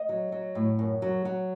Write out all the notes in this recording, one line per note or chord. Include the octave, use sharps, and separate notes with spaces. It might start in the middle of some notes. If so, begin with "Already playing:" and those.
Already playing: D#5
F#3
F#3
A2
F#2
F#3
F#3